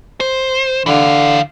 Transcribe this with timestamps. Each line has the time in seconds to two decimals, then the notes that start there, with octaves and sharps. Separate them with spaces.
0.20 C5
0.86 D3 E3 F5